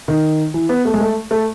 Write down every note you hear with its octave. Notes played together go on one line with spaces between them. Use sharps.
D#3
E3
B3
A3
G#3
A3
A3